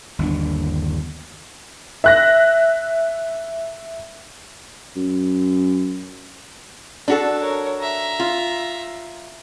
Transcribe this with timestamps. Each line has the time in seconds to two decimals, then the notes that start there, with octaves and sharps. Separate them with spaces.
0.19 G1 D#2 B3 D4
2.04 E5 F#6 A#6
4.96 F#2
7.08 D4 F#4 A4
7.39 A#4 C#5
7.79 E5 A#5
8.20 F4